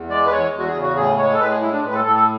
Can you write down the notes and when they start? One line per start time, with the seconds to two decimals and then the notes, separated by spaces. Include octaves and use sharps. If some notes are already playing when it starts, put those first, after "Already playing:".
Already playing: E2
0.10 G#3 D5
0.26 B4
0.32 E2 C#5
0.54 E2
0.59 F#4
0.68 G#4
0.75 C#3
0.82 F#4
0.96 A2 G#4
1.18 G#3 C#5
1.34 A4
1.40 A2 B4
1.51 G#4
1.62 G#3 E4
1.73 D4
1.83 A2 B4
1.94 A4
2.05 A2 A4
2.16 A4